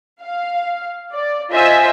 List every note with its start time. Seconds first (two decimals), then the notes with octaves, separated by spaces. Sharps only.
0.22 F5
1.13 D5
1.51 F4 C5 D#5 E5 G#5